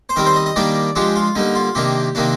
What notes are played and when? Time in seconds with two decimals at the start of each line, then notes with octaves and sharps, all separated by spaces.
0.09 C5
0.16 D#3 G3 C4 A#4
0.26 C5
0.36 D#5
0.46 D#5
0.56 D#3 G3 A#3 D4 D5
0.95 F3 G#3 D4 G4
1.16 F4
1.35 D3 G3 A#3 D#4
1.55 F4
1.75 C3 D#3 A#3 D4 G4
2.15 C3 D#3 A#3 D4